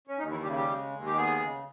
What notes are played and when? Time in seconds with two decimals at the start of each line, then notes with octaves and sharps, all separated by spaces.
0.07 C#4
0.18 D#2 D#4
0.31 E3 E4
0.43 C#3 G3 G4
0.50 E4
0.55 G3 G4
0.67 G#3
0.92 D#2
1.06 G4
1.16 G#3 B3 G#4
1.41 C#3